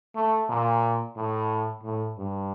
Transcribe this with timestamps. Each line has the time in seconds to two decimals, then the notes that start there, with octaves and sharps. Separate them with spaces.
0.15 A3
0.49 A#2
1.16 A2
1.83 A2
2.17 G2